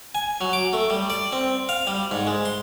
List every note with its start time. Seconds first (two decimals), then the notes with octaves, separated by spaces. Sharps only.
0.15 G#5
0.41 F#3
0.53 D6
0.73 A3
0.90 G3
1.10 D5
1.32 C4
1.69 F5
1.87 G3
2.11 G#2
2.27 G#3
2.45 C6